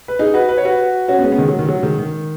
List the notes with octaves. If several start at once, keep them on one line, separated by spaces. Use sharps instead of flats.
B4
D#4 G#4
F#4 B4
B4
C#5
F#4 B4
C#4 F#4
B3
G#3 C#4
B3
D#3 G#3
F#3
D#3
F#3
D#3 G#3
D#3